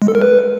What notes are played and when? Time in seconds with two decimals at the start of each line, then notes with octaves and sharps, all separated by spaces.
0.02 G#3
0.08 A4
0.15 A#4
0.22 B4